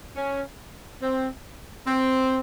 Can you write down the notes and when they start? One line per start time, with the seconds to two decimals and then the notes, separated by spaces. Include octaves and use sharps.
0.15 C#4
1.01 C4
1.86 C4